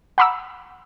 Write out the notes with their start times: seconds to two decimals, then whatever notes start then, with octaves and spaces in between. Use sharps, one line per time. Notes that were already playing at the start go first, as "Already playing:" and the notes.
0.18 F#5 A#5 B5 D6 E6